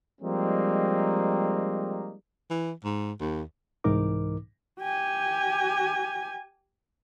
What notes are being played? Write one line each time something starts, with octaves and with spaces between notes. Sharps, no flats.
F3 G3 G#3 A#3 C4 D#4
E3
G#2
D#2
C2 G#2 E3 D#4 A#4 D6
G4 G#5